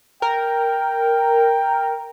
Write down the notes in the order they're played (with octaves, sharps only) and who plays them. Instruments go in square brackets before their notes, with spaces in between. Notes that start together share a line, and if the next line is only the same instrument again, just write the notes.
[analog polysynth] A#4 [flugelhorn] G5